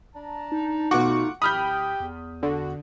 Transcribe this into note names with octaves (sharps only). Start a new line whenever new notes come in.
D4 A5 A#5
D#4
B2 A3 F4 F#4 F#5 C#6 D6
D1 G4 G5 B5 D#6 F6 G6
E2
D3 F#4